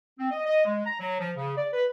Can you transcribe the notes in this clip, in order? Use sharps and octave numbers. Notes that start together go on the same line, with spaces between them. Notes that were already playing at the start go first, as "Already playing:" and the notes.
C4
D#5
D#5
G#3
A#5
F#3
F3
C#3
D5
B4